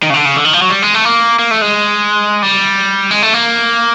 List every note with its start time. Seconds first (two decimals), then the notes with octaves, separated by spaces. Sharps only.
0.03 D#3
0.10 C#3
0.14 D3
0.25 C#3
0.37 D3
0.45 D#3
0.53 F3
0.62 F#3
0.70 G3
0.82 G#3
0.94 A3
1.05 A#3
1.39 A#3
1.51 A3
1.62 G#3
2.42 G3
3.11 G#3
3.23 A3
3.34 A#3